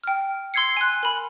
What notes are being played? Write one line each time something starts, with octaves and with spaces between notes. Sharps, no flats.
G5 F6
C6 E6 G#6 C7 C#7
G#5 C6 F#6
A#4 B5